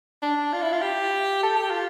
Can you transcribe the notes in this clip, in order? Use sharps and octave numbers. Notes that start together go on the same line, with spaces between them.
D4
F4
E4
F4
G4
A4
G4
F4